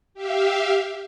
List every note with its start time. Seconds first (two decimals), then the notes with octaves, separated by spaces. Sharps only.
0.14 G4 E5 F5